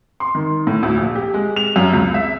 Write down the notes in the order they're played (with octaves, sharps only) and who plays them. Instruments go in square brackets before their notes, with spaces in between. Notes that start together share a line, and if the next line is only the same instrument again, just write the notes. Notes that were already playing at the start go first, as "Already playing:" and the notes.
[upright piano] C6
D#3
A2
D2
A#1
G4
G#3
F7
F#2
C#2
E5